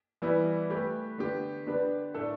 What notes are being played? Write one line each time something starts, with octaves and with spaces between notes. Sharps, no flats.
E3 G3 B3 E4
A3 G4 B4
D3 B3 G4
D3 B3 D4 G4 B4
A2 A3 D4 A4